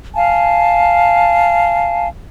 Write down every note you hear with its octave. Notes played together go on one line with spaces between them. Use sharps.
F5 G#5 A5